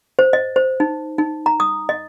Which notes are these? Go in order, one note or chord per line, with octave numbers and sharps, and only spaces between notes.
C5
D#5
C5
D#4
D#4
A#5
D#6
D#5